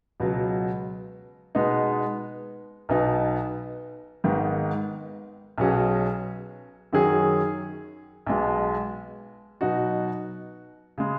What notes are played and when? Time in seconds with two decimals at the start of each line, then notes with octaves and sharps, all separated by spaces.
0.20 C#2 B2 F#3
1.55 B2 G#3 B3 D#4
2.89 B1 B2 B3 D#4
4.24 G#1 G#2 D#3 B3
5.58 B1 B2 F#3 C#4 G#4
6.93 F#2 D#3 F#3 C#4 G#4
8.26 B1 B2 G#3
9.61 B2 F#3 D#4 F#4
10.98 C#3 G#3